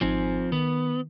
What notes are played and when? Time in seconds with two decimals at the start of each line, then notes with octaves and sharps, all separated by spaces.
0.01 G#1 F3 C4 D#4 G#5
0.52 D#3 B3